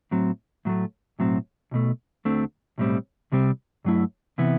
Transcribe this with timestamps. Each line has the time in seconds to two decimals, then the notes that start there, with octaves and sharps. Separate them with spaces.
0.11 A2 F#3 C4
0.65 A2 F#3 A3
1.19 B1 A2 F#3 C4
1.71 B1 B2 A3
2.25 D2 D3 A3 C4
2.78 B1 A2 G3 C4
3.32 C2 C3 G3 C4
3.85 G2 F#3 A3 E4
4.38 C3 E3 B3 E4